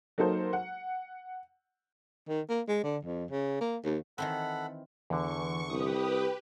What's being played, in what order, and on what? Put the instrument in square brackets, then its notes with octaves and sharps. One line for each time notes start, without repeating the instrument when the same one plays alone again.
[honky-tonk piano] F#3 A#3 D#4 A4 C5
F#5
[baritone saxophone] D#3
A#3
G#3
D3
F2
C#3
A#3
D#2
[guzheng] D#3 E3 C4 [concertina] A4 F#5 B5
[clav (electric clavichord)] E2 D3 [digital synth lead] E3 [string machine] C#6
[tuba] C2 [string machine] G4 B4 [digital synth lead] D#6